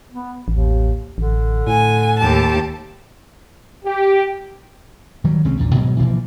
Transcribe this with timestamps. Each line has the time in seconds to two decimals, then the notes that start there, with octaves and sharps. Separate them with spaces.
0.12 B3
0.48 A1 D#2
1.18 A1 D3
1.67 A2 G#5
2.19 D#2 G4 A5
3.85 G4
5.24 D#3 F#3 G3
5.45 C2 G#3 C4 C#4
5.57 A#1 E2 A#2
5.74 G#2 B2 F#3 G3
5.99 B2 E3 F3 A#3